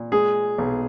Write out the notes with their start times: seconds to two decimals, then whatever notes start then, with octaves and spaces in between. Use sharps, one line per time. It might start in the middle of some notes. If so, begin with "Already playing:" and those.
Already playing: A#2
0.12 G#3 G#4
0.58 B1